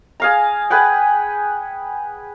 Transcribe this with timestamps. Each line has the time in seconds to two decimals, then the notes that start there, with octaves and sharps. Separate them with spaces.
0.20 G#4 F5 A#5
0.70 G#4 B4 F#5 G5